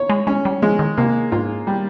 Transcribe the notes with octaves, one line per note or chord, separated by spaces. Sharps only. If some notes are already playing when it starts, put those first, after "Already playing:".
Already playing: C#5
G#3
G#3 C#4
G3
F3 G#3
D#3
C3 A#3
G#2 F4
G3